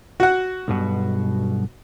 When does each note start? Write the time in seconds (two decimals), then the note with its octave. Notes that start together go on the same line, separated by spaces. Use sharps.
0.20 F#4 F#5
0.68 B1 G2 B2